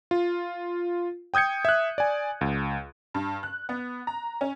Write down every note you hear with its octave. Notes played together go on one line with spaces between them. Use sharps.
F4
G5 D#6 G6 G#6 C#7
E5 F#6
D5 G#5
C#2
G2
F#6
B3
A#5
C#4